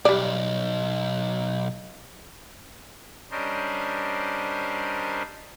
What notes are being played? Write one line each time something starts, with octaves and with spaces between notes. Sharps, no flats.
B1 G3 D5
G3 C#4 D4 A#4 C5 D#5